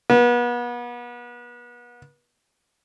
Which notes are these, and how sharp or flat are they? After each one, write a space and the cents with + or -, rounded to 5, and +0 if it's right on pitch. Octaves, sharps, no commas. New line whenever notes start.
B3 -35